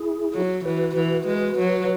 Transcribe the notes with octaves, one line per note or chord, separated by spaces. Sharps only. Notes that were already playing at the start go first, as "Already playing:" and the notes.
Already playing: E4 G#4
F#3
E3 F#4 B4
E3
G#3
F#3